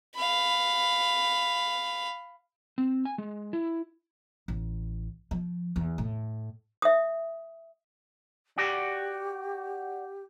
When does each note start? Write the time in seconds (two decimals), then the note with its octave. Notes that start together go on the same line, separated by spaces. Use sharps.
0.16 F5 B5
2.78 C4
3.05 G#5
3.18 G#3
3.53 E4
4.48 A1
5.31 F3
5.76 E2
5.98 A2
6.82 E5 D#6
8.58 F#4 G4 D5